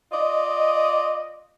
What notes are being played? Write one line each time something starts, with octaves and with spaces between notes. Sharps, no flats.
F4 D5 D#5